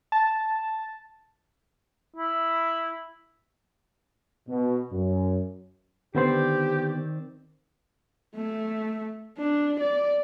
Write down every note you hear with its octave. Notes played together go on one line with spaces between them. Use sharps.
A5
E4
B2
F#2
D3 D#3 B3 C4 G4 C5 D5
A3
D4
D5